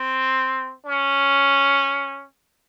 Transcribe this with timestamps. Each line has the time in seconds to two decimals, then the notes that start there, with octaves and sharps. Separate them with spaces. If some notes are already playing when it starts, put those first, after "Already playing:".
Already playing: C4
0.85 C#4